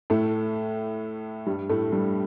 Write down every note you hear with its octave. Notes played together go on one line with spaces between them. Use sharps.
A2 A3
G2 G3
A2 A3
G2 G3